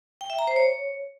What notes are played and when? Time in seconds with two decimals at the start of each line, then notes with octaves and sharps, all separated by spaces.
0.21 G5
0.30 E5
0.39 A#5
0.47 C5
0.56 C#5